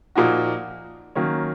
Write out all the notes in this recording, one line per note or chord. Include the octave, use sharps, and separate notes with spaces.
A#2 F3 A#3 D#4 F#4
D#3 F#3 A#3 C#4